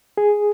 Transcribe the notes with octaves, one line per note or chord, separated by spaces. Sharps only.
G#4